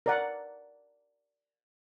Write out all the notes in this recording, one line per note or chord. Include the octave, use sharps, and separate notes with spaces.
A#4 D5 F#5